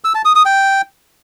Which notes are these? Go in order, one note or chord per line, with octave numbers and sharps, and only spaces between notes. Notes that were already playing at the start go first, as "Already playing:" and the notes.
E6
A5
D#6
D#6
G5